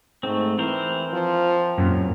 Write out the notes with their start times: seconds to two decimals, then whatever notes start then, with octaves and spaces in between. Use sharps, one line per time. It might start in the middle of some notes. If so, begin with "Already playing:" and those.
0.23 G#2 A3 C4
0.58 E3 C4 A#4 C5
1.13 F3
1.78 F#2 A#2